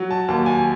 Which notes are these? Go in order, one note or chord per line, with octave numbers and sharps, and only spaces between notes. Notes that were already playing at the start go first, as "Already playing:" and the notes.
Already playing: F#3
A5
D#2 A5
G#5